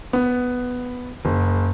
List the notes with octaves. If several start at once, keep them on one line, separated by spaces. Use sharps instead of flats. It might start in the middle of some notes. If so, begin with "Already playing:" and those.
B3
F#1